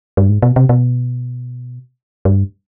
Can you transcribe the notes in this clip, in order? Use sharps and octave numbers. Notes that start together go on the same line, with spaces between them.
G2
G#2
B2
C3
B2
G2